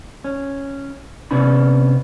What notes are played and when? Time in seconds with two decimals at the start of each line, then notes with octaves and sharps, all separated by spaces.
0.24 C#4
1.31 C3 B3 C#4 D4 B5